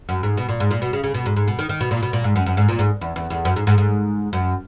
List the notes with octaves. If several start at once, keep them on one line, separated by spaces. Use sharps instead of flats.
F#2
G#2
B2
A#2
G#2
A#2
B2
C#3
C#3
B2
G#2
G#2
B2
D#3
D#3
B2
A#2
B2
A#2
G#2
F#2
F#2
G#2
A#2
G#2
E2
E2
E2
F#2
G#2
G#2
G#2
F#2